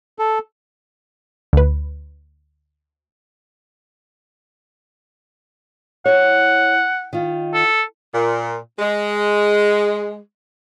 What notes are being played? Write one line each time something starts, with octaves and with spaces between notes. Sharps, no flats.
A4
D2 B4
E4 C#5 F#5
D#3 F4
A4
A#2
G#3